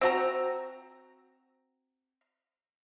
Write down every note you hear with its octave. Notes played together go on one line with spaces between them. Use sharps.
C4 F#4 A#5